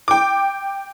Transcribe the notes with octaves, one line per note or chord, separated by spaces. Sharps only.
G5 D6